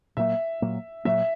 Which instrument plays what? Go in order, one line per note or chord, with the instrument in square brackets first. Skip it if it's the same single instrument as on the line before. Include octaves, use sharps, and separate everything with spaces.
[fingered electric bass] A#2 F#3 A#3 [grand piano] E5
[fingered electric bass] A#2 F#3 A#3
[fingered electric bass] A#2 F#3 A#3 [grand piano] E5